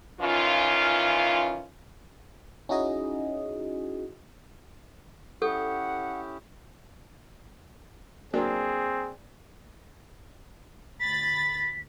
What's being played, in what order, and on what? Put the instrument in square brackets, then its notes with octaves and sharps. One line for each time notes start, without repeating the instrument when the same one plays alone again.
[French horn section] D#3 E3 C#4 F4
[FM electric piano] C#4 D#4 E4 F#4 G#4 D#5
[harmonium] C#4 E4 G4 [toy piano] A4 [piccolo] F#5 [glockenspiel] C#6 D#6 G6
[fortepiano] F#3 A#3 D4 [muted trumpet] C4 [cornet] G#4
[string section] D2 B5 A6 [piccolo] B6